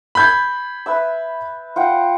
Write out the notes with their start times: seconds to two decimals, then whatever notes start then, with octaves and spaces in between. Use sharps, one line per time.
0.15 B5 G6 G#6
0.86 B4 E5 E6
1.76 F4 F#5 G5